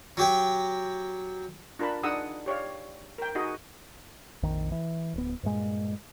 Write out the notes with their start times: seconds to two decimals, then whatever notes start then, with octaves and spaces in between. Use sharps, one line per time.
0.17 F#3 G4 G5
1.79 D4 F4 A#4 A5 B5
2.03 D4 D#4 G#4 F#5 D#6 E6
2.46 G4 C#5 D5 F5
3.18 A#4 G5
3.35 D#4 F#4 G#4 D#5
4.43 A#1 F2 D#3
4.72 E3
5.14 D1 B3
5.43 G2 A#2 G#3